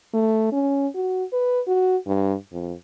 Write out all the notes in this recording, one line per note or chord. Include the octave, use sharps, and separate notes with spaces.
A3
C#4
F#4
B4
F#4
G2
F2